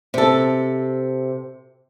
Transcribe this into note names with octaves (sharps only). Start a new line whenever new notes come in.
C3 A4